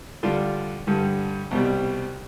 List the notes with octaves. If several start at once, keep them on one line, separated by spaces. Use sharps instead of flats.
D3 G3 D4 F4 A4
G2 D3 G3
C2 B2 G3